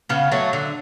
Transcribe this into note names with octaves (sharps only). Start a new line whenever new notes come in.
C#3 B3
F#3 A3
D3